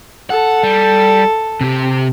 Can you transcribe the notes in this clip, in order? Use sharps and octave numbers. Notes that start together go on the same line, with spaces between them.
A4 F#5
G3
C3 G4